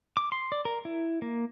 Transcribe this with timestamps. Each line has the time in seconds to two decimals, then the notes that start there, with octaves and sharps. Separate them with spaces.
0.17 D6
0.32 C6
0.52 D5
0.65 A#4
0.85 E4
1.22 A#3